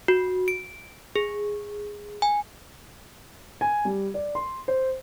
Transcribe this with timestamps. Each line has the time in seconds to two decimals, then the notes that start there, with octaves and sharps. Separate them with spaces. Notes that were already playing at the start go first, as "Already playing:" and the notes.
0.08 F#4
0.48 D7
1.16 G#4
2.22 G#5
3.61 G#5
3.85 G3
4.14 D5
4.35 C6
4.68 C5